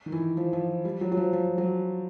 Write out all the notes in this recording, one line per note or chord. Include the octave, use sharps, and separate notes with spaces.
D#3
E3
F3
F3
G3
F#3
F#3
F3
F3
F#3